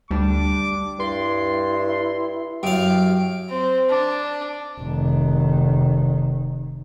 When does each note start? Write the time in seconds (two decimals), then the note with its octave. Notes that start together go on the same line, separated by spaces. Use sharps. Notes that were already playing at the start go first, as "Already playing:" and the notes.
0.11 D2 G3 D4 D6
0.99 G2 E4 C6
2.63 F#2 G4 F5 D7
3.49 C4
3.89 D4
4.81 F1 D#3